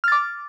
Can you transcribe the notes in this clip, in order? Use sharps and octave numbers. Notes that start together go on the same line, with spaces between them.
D6 F6 A6